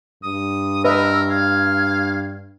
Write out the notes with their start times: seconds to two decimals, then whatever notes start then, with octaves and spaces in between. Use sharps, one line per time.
0.23 G2 D#6
0.84 A#4 B4 D#5 E5 E6
1.30 F5 G#6